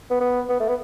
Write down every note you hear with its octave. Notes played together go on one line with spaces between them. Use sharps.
B3
B3
B3
A3
B3